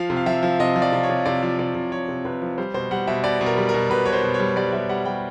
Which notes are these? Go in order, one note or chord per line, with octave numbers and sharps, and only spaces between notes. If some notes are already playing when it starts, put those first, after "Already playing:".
Already playing: F3 F5
C3
F5
F3 E5
F3
C3 D#5
F3
D5
C3
C#5
C3
C3 D5
F3
C3 D5
C3
F3 C#5
C3
C3 B4
F3
G3 C5
B2 C5
G3 F#5
B2 E5
B2 D5
B2
A#4
G3
A#4
B2
B2 B4
B2 C#5
C5
B2
C#5
G3
G3 D5
G3 E5
G3 F#5
G3 G5